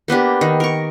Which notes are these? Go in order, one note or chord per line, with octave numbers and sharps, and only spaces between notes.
A#3 B3 D4 G4
D#3
A#4 C#6